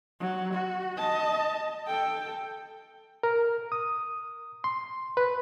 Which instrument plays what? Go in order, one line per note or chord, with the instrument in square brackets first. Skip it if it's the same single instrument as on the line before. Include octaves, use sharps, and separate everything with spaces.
[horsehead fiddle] F#3
F#4
D#5 A5
A4 G5
[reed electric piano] A#4
D#6
C6
B4